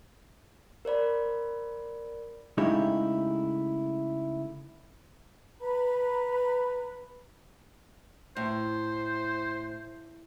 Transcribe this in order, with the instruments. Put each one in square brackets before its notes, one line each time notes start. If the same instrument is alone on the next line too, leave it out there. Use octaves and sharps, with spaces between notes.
[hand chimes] A#4 C5 D5 B5
[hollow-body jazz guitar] C#3 G#3 A3 D#4 E4 G4
[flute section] B4 A#5 B5
[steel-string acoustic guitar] A2 [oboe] C5